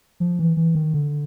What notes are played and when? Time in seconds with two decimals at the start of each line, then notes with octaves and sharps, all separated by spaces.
0.20 F3
0.39 E3
0.57 E3
0.75 D#3
0.94 D3